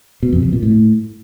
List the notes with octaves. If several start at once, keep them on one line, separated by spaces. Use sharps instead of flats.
B2
F2
C3
A#2
A2